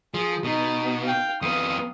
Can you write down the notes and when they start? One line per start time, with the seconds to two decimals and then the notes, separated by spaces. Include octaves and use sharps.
0.14 F3 G#4
0.44 B2 D#4
1.03 F5 G5
1.42 F2 B3 F5 D#6